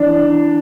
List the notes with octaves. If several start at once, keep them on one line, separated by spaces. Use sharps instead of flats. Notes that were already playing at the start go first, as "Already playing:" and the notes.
Already playing: E3 D4